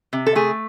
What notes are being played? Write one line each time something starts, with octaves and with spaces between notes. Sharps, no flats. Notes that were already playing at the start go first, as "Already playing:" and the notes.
C3
A4
A3 G#4